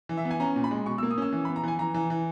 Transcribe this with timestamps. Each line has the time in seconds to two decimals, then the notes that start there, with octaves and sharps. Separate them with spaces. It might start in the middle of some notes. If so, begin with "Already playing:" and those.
0.09 E3
0.17 E5
0.25 B3
0.31 G#5
0.40 C#4 A#5
0.56 A#2
0.64 B5
0.71 G#3
0.86 B2 C#6
0.98 E6
1.03 A#3
1.11 D#6
1.18 C#4 E6
1.32 E3
1.45 B5
1.49 B3
1.56 A#5
1.63 E3 G#5
1.79 E3 A#5
1.94 E3
2.10 E3